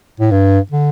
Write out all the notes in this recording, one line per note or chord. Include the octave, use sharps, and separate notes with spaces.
A2
G2
D3